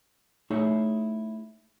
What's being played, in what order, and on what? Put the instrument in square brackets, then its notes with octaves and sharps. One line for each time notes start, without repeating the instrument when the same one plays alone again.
[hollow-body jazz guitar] A3 D#4 E4 G#4 C#5 E5